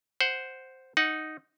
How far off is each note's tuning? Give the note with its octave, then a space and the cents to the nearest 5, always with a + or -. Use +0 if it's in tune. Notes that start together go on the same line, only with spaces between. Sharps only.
C5 +0 F#5 +5
D#4 +0 F#5 +0